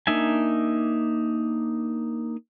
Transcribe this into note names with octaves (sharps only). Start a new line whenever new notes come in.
A#3 D4 D#4 E5 G#5